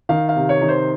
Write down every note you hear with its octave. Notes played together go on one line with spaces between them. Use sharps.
D#3 F5
F5
C3
C#5
D#3
C5